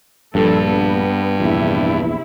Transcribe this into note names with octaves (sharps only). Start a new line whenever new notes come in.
A#1 G2 F3 A4
B3
A#1 E2 C3 E4